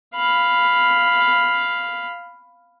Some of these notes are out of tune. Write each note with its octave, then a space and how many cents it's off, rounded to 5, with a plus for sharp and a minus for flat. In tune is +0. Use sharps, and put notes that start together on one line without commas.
F5 +0 B5 +5